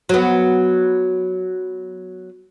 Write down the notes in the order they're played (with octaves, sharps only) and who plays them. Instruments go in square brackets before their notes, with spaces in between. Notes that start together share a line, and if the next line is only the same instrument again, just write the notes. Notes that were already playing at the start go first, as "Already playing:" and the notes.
[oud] F#3 B3